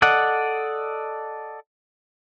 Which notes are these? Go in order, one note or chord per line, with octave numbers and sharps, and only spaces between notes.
A4 D5 D#5 F#5